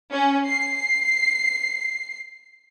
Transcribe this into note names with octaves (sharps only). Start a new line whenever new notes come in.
C#4
C7